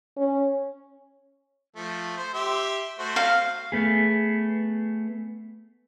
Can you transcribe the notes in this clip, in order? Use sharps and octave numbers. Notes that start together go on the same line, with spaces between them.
C#4
F3 A3
C5
G4 E5 C6
A3 F#4 C5
F5
A3 B3 G#4